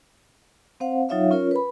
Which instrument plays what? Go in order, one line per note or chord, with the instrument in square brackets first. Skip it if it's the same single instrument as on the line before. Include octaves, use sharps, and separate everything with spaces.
[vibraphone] C4 C5 F5 F#5
F#3 D#4 F4 C#5 E5 F5
C#4 F4 A#4 C#5
B4 B5